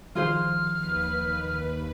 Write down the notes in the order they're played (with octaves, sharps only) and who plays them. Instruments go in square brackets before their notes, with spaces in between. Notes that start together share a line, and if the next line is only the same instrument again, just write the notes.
[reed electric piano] D#3 F3 [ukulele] F4 G#4 C5 [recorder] F6
[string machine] D#2 B4